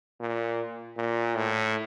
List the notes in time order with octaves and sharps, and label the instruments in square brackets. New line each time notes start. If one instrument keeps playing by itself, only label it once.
[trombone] A#2
A#2
A2